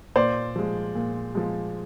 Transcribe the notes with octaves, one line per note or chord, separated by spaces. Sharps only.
A#2 C5 D5
F3 G#3
A#2
F3 G#3